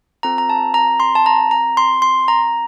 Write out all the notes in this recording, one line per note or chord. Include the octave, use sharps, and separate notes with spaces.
C4 F4 A4 A#5
A#5
A5
A#5
C6
A5
A#5
A#5
C6
C6
A#5